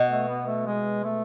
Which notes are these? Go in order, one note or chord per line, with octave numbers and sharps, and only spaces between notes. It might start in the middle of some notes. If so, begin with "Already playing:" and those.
Already playing: B2
A3
B3
A3
G#3
A3